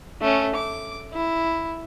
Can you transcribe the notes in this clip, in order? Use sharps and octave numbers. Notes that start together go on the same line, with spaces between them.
A3 C#4
D6
E4